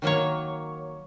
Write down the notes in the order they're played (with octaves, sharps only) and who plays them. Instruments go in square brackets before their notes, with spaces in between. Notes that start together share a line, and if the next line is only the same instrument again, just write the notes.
[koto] D#3 F#3 A#3 C#5